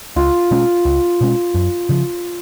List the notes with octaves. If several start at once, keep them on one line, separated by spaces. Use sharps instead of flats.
C#2 F4
B2 G#3 C#4
C#2
B2 G#3 C#4
F#2
C#3 F3